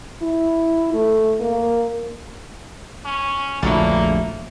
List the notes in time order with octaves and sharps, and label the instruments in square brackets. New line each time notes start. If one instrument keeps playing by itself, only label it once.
[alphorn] E4
A3
A#3
[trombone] C#4
[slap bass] A#1 E2 [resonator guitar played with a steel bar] D3 F#3 E4 [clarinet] A3 [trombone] A#3